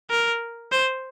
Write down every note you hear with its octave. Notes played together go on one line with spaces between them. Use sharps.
A#4
C5